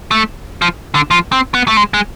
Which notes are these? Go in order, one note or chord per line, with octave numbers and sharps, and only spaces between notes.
A3
F3
D3
F3
C4
B3
A3
G#3
G#3